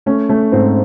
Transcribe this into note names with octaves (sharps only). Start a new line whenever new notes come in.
A3 C#4
A3 C#4
G#2 C4